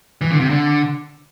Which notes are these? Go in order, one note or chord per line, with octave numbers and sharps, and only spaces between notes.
E3
D3
C3
D3